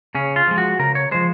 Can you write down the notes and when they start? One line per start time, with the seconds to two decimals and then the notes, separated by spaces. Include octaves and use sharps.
0.15 C#3 C#4
0.36 F4
0.47 F3 G#3
0.58 F#4
0.79 C#3 A#4
0.95 C#5
1.11 F3 G#3 C5